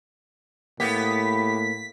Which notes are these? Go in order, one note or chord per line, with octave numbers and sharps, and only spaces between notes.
A2 A#3 B3 G4 B6